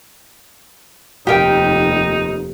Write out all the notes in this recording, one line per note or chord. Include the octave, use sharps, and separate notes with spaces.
F1 D#2 D#4 G4 A#4 G5